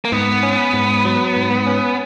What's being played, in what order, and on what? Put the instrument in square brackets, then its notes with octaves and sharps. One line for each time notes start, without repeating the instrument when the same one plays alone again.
[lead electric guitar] A#3
[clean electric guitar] G#2 [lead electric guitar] B3
[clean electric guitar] C#4
G#2
F#3
G#2
C#4